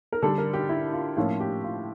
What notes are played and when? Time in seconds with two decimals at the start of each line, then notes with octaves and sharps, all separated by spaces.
0.12 A#4
0.22 D3 G3 D4 A4
0.38 A#4
0.53 G4
0.69 E4
0.93 F4
1.17 A2 F3 A#3 C#4 F4
1.40 G4
1.64 F4